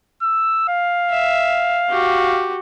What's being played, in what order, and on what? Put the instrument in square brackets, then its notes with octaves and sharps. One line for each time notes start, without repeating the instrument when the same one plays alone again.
[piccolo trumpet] E6
F5
[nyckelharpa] E5
F#4 G4